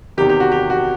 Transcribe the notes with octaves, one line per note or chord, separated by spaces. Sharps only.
E2 C3 D#3 G4
G4
F#4
G4
F#4